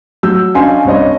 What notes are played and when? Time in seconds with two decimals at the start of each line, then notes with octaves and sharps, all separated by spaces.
0.23 F#3 E6 G6
0.54 C#4 D4 D#5 F5 G#5 C6
0.85 C2 G2 C#5 D#5